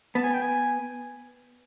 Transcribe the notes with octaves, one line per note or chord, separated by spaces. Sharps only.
B3 A5
G#5
G5
G#5